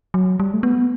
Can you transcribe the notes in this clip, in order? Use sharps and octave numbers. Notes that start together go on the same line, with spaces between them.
F#3
G3
A3
B3